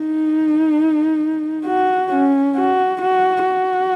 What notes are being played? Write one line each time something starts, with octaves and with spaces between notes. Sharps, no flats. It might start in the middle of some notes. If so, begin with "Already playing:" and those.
Already playing: D#4
F#4
C#4
F#4
F#4
F#4